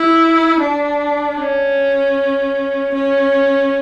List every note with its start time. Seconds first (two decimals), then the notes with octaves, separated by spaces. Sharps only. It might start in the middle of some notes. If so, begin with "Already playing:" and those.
Already playing: E4
0.60 D4
1.37 C#4
2.94 C#4